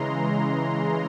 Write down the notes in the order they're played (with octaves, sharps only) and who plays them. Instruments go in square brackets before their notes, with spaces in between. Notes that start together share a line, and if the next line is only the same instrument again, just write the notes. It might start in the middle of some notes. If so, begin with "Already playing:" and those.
Already playing: [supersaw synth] C#3 E3 G#3 A#5 C6